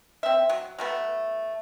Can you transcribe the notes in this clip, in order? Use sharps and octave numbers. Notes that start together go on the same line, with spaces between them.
C4 E5
F#3
F#3 A3 B3